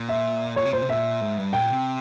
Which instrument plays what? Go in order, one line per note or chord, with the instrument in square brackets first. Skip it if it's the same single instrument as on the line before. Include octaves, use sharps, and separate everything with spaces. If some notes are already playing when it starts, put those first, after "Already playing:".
Already playing: [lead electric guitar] A#2
[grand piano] E5
[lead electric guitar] A#2 [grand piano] C#5
[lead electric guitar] C3
[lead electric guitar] A#2 [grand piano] C5
[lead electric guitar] C3
[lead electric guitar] A#2 [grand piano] E5
[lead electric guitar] G#2
G2
[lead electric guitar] A#2 [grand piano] G5
[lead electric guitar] C3